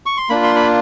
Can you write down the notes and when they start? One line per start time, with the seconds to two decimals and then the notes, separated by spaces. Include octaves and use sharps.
0.06 C#6
0.17 C6
0.29 A#3 D4 F4 B5
0.43 C6
0.56 B5